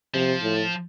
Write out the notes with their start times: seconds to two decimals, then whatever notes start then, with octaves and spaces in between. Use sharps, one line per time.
0.14 C3 F3
0.42 A2